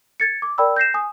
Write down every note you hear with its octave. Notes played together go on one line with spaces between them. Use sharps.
G#6 A6 C#7
D6
A#4 D5 G5 B5 E6
G6 A#6 C7 E7
G#5 D#6